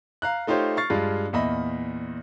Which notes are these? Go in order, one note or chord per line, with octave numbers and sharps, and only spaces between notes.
F5 A#5 F#6
A3 D#4 F4 G4 C5 C#5
C#6 F6 A6 C7
G2 G#3 F4
E2 A#2 D#5 E5 B5 A#6